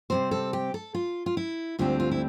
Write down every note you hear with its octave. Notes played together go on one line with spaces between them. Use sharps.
C3 G3 C4 C5
A4
G4
A4
F4
F4
E4
D2 D3 G3 C4 F4
F4
E4